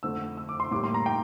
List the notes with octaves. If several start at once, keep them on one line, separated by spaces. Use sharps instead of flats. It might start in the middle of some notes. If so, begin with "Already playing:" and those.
F2 D3 A3 E6
E6
D6
C6
A2 G3 A#3 D6
C6
A#5
G5